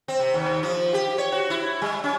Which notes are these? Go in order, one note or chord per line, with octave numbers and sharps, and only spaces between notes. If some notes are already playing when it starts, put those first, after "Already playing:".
C4
C3
D#2
F3
G4
C#5
F#4
E4
G3
C#4